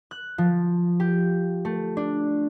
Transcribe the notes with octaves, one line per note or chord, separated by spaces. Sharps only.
F#6
F3
G4
A3
D4